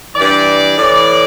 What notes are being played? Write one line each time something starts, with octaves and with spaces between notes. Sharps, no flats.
G2 E3 D5
A2 E3 D5